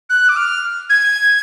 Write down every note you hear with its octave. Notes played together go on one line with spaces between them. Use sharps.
F#6
D6
F6
G#6